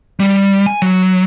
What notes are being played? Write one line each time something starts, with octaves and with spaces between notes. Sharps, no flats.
G3
G#5
F#3